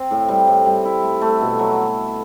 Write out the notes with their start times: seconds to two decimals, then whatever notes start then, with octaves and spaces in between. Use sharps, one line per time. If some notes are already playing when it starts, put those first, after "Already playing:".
Already playing: C4
0.11 A2
0.29 G3
0.47 A2
0.66 G3
0.85 E4
1.03 A3
1.21 A3
1.41 B2
1.59 F#3